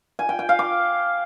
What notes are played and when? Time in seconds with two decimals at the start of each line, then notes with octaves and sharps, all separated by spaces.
0.19 G#5
0.29 G5
0.39 G5
0.49 F5
0.59 D6